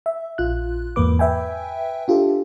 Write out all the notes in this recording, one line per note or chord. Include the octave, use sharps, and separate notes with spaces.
E5
A#1 F4 F#6
E2 G#2 A#3 B4 D6
B4 E5 G5 G#5
D4 F4 G4 A4